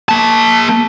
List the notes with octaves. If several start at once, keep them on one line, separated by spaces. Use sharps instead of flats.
A#3 A5